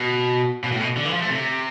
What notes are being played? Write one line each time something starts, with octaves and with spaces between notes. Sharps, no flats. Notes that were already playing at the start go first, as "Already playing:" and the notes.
Already playing: B2
B2
A2
B2
D3
E3
F3
A3
C3